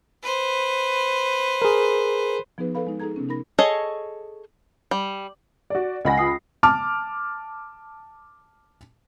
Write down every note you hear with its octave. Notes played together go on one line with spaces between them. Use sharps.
B4 C5
G#4 A#4
F3 B3 D#4 G#4 B4
A4 B4 F5 B5
G#3 D#4
D#4 G#4 A4 A#5 G#6
C3 B3 C#4
D#4 A#4 B5 A#6
G#4 A4 C#5 D#5
G3
F#4 D5
C#2 D#5 F#5 G#5 B5 A#6
F4 D#6 C7
A5 D6 F6